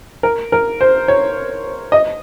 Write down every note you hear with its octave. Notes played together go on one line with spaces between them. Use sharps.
A#4
A#4
C5
C#5
D#5